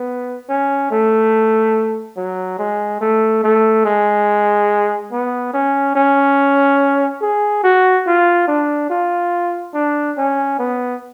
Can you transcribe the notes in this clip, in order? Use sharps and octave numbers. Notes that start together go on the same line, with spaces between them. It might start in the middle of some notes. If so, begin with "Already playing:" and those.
Already playing: B3
C#4
A3
F#3
G#3
A3
A3
G#3
B3
C#4
C#4
G#4
F#4
F4
D4
F4
D4
C#4
B3